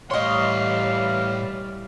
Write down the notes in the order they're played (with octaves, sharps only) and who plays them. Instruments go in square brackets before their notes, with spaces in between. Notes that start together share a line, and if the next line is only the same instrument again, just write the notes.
[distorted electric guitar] A2 C6 [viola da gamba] E3 G3 [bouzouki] C#5 D#5 [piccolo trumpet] F5